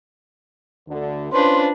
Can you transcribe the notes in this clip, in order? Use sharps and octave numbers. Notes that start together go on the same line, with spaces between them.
D2 D3
C#4 D4 F4 B4 C5 C6